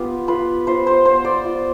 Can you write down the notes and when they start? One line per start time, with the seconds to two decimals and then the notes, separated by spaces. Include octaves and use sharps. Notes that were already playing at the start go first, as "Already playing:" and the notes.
Already playing: B3 F4 G4
0.28 F4 B4
0.67 F4 C5
0.87 C5
1.05 B3 C5
1.25 D5
1.44 F4